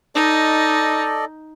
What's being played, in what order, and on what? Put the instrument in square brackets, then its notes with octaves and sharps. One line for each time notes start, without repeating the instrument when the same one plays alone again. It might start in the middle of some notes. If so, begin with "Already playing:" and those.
[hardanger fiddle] D#4 [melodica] A4 D5 D#5